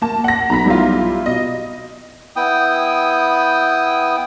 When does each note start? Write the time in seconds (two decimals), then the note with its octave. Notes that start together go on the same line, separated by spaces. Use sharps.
0.02 A#3 A5
0.24 F#5 A#6
0.50 B1 A#5 B5 B6
0.66 G3 E4 F4
1.26 B2 D#5
2.36 B3 E4 G5 D#6